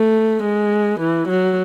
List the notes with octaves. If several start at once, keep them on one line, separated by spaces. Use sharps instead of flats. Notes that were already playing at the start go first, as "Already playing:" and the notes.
Already playing: A3
G#3
E3
F#3